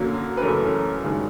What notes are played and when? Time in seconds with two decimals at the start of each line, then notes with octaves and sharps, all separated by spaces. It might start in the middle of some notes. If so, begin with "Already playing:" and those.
Already playing: F#2 D3 F#3 A#3
0.37 B4
0.42 F#2 C#3 E3 A3 A#4
1.04 G2 D#3 G#3